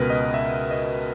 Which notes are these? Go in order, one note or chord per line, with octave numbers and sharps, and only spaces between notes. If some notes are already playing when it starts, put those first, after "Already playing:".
Already playing: C#2 B2 A#4 B4
D#5
E5
D#5